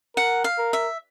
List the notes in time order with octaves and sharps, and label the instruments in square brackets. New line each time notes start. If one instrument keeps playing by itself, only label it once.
[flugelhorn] A#4 [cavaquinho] F#5
[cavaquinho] F5
[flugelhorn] A#4
[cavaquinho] E5